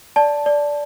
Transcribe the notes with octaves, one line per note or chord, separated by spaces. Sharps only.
D5 A5
D5